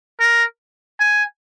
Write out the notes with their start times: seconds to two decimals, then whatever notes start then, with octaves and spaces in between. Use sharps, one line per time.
0.20 A#4
1.00 G#5